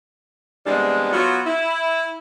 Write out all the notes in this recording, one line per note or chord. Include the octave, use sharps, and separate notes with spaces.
C3 E3 G3 G#3 B3 D4
F#3 B3 F4 F#4
E4